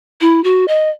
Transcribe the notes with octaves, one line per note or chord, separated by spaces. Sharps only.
E4
F#4
D#5